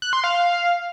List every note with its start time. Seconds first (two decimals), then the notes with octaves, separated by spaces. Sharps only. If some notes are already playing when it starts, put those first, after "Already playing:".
0.02 F#6
0.13 C6
0.24 F5